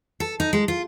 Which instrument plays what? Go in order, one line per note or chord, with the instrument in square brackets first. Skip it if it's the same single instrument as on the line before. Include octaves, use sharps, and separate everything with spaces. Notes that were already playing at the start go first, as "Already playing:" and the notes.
[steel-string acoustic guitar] A4
D#4
G#3
F4